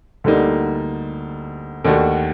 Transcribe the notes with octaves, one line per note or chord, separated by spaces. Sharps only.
D2 D3 G3 A#3 D#4
D#2 D#3 A3 D4 F#4